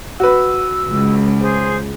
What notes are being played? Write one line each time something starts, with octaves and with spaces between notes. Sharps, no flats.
F#4 B4 E6
C#2
G#4 C5